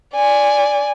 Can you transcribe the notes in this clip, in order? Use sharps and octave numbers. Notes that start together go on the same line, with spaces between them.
D5 G#5